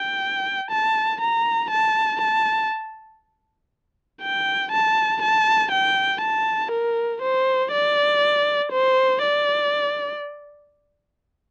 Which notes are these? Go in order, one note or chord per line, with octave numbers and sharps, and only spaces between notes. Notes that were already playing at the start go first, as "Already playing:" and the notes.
Already playing: G5
A5
A#5
A5
A5
G5
A5
A5
G5
A5
A#4
C5
D5
C5
D5